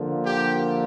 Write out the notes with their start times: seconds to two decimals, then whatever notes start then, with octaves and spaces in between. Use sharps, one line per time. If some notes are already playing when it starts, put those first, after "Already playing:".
Already playing: D3 F3 A#3
0.23 G4